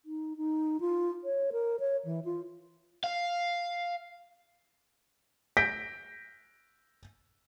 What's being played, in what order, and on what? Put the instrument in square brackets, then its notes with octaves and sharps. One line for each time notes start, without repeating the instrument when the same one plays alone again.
[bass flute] D#4
D#4
F4
C#5
A#4
C#5
E3
F4
[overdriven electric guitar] F5
[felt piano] G6 A#6 B6 D7